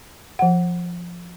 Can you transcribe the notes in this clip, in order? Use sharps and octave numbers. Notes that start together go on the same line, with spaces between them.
F3 F#5